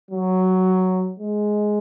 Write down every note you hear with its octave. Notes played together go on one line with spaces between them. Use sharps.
F#3
G#3